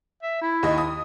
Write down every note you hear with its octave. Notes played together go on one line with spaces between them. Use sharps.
E5
E4
D#2 D#5
D#6